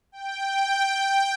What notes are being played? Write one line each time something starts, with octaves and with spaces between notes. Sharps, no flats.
G5